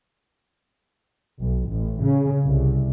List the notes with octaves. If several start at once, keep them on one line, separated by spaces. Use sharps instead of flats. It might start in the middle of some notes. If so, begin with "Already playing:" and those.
B1
A1
C#3
C2